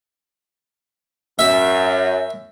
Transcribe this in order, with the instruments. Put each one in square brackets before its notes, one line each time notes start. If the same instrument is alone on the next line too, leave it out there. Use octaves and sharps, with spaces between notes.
[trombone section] F#2 [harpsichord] E5